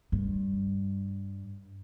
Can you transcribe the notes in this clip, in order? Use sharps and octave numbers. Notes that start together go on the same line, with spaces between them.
G2